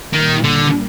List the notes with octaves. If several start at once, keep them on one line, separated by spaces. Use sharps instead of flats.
A#2 D#3 G3 A#3
D3